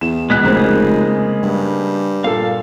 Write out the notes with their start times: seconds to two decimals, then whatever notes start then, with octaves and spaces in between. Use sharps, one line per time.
0.01 E2 E7
0.30 C#2 B2 G#3 F#6 B6
0.43 F1 C#3 A#3 C5
1.43 G2
2.24 A#2 A4 F5